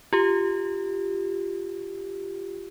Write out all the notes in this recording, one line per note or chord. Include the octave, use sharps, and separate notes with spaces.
F4 G4